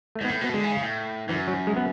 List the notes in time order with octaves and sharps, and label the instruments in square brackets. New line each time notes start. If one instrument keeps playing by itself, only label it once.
[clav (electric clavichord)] A3
[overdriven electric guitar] G#2
[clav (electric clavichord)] B3
[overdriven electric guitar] A2
[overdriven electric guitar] B2 [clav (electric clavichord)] B3
[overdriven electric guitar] D3 [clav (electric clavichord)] G#3
[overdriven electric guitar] E3
C#3
A2
[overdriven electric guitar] F#2 [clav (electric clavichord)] E3
[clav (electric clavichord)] F#3
G#3
B3